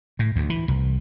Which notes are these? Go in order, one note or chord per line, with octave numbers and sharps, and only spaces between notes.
A2
D2
E3
C2